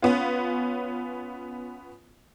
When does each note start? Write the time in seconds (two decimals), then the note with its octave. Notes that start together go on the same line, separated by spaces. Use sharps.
0.02 B3 C#4 F4